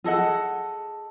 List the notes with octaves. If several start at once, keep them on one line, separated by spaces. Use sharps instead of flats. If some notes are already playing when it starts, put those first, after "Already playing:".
G#4 A4 D#5 F#5